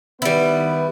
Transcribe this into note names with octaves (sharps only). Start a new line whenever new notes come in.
D#3 G3 B3 E4 B4